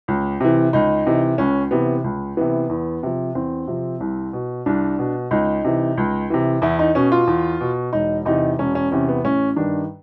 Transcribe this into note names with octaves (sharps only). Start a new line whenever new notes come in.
C#2
C3 E3
C#2 D#4
C3 E3
C#2 C#4
C3 E3 B3
C#2
C3 E3 B3
E2
C3 F3
E2 C4
C3 F3
C2
B2
C2 D4
B2
C#2 D#4
C3 E3
C#2
C3 E3
E2 E4
D#4
B2 C#4
F4
E2
B2
E1 D#4
E2 C3 D#4
E1 C#4
C#4
E2 C3 C#4
B3
A1 C#4
G2 D#3 D4